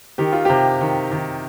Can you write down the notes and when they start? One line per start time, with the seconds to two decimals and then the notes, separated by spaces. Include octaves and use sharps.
0.18 D#3 G4
0.32 F4
0.45 C3 G4
0.81 D#3
1.12 D#3